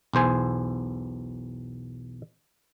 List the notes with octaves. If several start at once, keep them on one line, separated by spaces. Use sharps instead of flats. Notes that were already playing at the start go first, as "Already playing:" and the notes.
B1 E2 C5 G#5